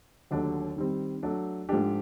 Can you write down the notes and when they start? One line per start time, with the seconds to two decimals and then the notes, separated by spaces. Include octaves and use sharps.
0.31 D#2 D3 F#3 A3 D4
0.77 D#3 G3 C4
1.23 F#3 A3 D4
1.69 G#2 F3 A3 D4 G4